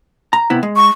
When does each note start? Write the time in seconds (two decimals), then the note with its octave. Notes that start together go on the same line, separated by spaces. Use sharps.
0.33 A#5
0.50 C3 B3 E4
0.63 G#3
0.76 C#6